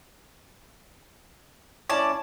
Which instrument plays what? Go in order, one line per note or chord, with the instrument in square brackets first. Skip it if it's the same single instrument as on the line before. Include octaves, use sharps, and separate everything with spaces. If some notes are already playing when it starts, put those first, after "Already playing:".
[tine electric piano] C#4 E4 C#5 [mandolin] D5 A5